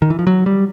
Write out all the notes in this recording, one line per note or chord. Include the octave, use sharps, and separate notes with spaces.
D#3
E3
F3
F#3
G3